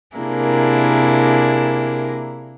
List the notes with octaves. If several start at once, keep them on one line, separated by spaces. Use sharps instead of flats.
C3 A#3 D4 E4 G#4 A#4